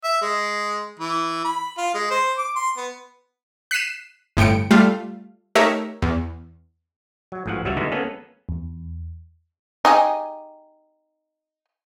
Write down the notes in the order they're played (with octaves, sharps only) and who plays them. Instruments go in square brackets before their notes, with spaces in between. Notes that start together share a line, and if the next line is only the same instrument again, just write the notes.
[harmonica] E5
G#3
E3
B5
F4
G#3
C5
D6
C6
B3
[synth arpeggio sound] F#6 B6 C7 D#7 E7
G1 A2 G5 C#7 D7
G3 A3 F4 F5
A3 D#4 G4 A#4 C#5 E5
E2
[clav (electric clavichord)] F#3
A1 G#2 F3 F#3 F#5
C#2 F#3 G3 C#5 E5 F#5
D3 G#3 B3 D#4 E4 F#4
A#3 B3 C#4 G#4 A4 B4
[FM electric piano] E2
[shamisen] D#4 G4 G#4